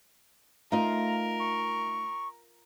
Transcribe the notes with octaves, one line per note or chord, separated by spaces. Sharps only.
A3 D#4 F4 A#4 A#5
C#6